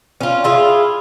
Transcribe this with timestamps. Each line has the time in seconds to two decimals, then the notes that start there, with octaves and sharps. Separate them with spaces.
0.21 C#4 F4
0.44 E4 F4 G#4